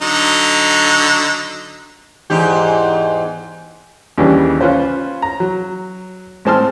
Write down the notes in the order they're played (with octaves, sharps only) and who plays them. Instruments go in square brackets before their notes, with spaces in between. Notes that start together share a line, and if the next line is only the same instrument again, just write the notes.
[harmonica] D3 F#3 D#4
[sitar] E2 G#2 G4
[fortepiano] D#2 C#3 E3 G3 C#4 D4
C#4 F4 B4 C5
A#5
F#3
A2 G#3 C4 A5 C6 F6